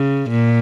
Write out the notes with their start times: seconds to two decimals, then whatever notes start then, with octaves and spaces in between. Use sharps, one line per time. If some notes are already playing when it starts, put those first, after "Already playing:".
Already playing: C#3
0.30 A#2